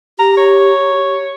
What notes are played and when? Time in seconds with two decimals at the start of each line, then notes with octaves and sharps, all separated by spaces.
0.19 G4 A#5
0.37 C#5